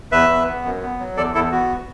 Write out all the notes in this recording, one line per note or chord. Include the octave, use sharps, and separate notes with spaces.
E2 B4 E5
E2
B3
F#2
B3
F#3
E2 A4 D5
E2 E4 A4
B3 F#4